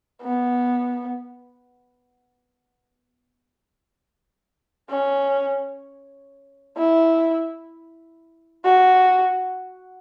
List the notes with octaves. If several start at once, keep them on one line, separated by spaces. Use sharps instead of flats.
B3
C#4
E4
F#4